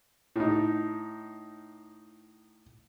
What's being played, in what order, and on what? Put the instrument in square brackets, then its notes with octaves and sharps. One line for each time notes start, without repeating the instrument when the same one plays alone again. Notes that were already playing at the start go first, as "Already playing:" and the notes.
[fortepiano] A2 D#4